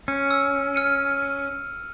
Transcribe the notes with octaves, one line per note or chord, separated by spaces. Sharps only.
C#4
E6
F6 C#7 D#7